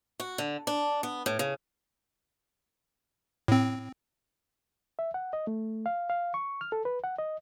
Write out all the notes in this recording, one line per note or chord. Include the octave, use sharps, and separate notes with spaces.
F#4
D3
D4
B3
A2
C#3
A2 C4
E5
F#5
D#5
A3
F5
F5
C#6
F6
A4
B4
F#5
D#5